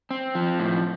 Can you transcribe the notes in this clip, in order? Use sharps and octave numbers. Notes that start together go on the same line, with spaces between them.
C4
F3
A2